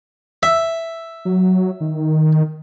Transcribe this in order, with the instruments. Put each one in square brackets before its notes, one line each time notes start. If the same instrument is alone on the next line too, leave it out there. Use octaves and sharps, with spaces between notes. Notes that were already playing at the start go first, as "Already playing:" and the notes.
[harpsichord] E5
[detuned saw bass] F#3
D#3